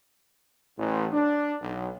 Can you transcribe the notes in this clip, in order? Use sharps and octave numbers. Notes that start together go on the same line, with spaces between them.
A1
D4
B1